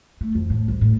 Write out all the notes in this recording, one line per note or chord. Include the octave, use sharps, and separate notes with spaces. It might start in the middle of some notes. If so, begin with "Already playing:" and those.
A3
F2
A2
C2
A2